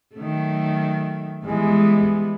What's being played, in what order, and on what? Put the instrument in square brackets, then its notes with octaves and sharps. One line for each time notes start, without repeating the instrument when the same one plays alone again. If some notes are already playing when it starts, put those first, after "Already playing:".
[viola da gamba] D#3 F#3 A3
[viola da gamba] E3 G3 B3 [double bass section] G#3